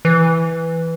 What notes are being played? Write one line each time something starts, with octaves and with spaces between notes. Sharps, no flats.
E3